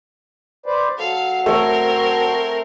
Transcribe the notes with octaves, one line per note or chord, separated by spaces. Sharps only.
B4 C5 D5
F#3 A4 F5
A3 C4 A#4 C#5